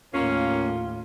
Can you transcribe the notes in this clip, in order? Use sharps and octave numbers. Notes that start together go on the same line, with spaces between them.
D#2 A2 A#3 C#4 F4